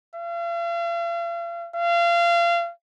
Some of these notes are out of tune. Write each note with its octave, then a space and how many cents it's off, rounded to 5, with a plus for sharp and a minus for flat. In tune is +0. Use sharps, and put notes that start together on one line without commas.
F5 -40
F5 -30